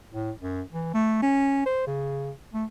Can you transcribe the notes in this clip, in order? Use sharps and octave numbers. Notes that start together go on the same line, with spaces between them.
A2
F#2
E3
A3
C#4
C5
C#3
A3